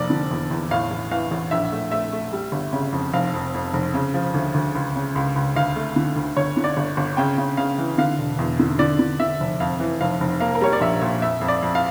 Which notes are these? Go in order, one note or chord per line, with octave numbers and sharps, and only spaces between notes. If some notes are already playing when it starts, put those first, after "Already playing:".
Already playing: F1 A#3 D5
D3
E2
E2
A2 F5
A1
E3 F5
A1
A#1 E5
A3
A3 E5
A3
G3
G1
C#3
F2
F1 F5
F2
F2
F1
C#3
F3
D2
D2
C#2
C#3
C#2
C#2
D2 F5
A3
D3
D2
G1 C#5
D3
D5
G1
G1
C#3 G5
C#3
C#3 F5
E3
D3 F5
E1
E2
D3
D3 D5
D3
D3 E5
F1
F2 F5
E3
F1 F5
F1
A#3 F5
A#4
G3 C#5
D5
A#1 E5
A#2
F2 E5
F2
D5
F2
F5